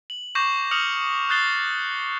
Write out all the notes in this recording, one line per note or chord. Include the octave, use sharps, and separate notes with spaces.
F#7
C#6 D6 G6 A#6 C7 E7
D#6 F6 C#7 F7 F#7
D#6 F#6 G6 A6 C7 G7